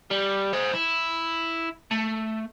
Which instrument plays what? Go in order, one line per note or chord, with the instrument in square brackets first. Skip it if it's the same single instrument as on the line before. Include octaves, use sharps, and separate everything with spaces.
[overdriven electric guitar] G3
C5 D#5
E4
A3